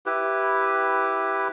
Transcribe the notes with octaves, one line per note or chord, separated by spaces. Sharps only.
E4 G4 B4